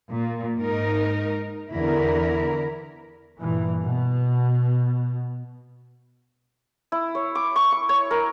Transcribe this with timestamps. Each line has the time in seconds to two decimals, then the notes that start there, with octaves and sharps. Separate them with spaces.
0.10 A#2
0.57 G#2 D#4 A#4
1.73 E2 D3 E4 A#4
3.40 G2 A#2 E3
3.84 B2
6.92 E4
7.15 C#5
7.35 D6
7.56 C#6
7.72 C#6
7.89 C#5
8.11 A#4